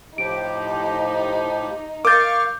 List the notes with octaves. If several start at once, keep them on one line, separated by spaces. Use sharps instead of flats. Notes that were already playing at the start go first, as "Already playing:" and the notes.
A2 F3 D#4 G4 D7
A#4 F5 C#6 D6 F6 G6 A6